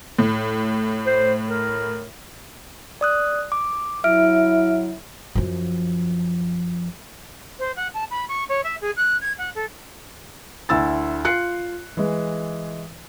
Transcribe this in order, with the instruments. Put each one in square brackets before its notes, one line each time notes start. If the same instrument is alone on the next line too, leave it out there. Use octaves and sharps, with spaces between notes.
[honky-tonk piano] A2
[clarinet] C5
A#4
[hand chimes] D5 D#6 F#6
D6
[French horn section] F#3 E4 [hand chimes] E5 F6 D7
[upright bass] F#2 F3
[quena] C5
F#5
A5
B5
C#6
C#5
E5
G#4
F#6
G#6
F#5
A4
[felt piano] D2 E4 E6 A6
F4 F#6 C7 C#7
E3 G#3